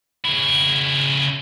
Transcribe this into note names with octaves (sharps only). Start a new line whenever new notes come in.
C#3 E4